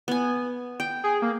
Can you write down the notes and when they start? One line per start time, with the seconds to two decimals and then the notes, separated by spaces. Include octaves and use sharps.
0.08 B3 G#5
0.80 G5
1.04 G#4
1.22 A#3